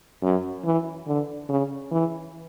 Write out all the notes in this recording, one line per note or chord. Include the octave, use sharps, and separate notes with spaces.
F#2
E3
D3
C#3
E3